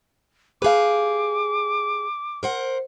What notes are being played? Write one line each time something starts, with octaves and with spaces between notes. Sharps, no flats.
G4 G#4 B4 F5 D6
A#4 C5 F#5